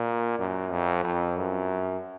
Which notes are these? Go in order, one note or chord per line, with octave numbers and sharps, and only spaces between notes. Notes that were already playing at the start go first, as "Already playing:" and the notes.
Already playing: A#2
F#2
F2
F2
F#2